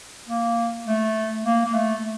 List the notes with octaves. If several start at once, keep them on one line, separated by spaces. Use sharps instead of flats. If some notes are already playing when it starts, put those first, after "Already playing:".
A#3
A3
A#3
A#3
A3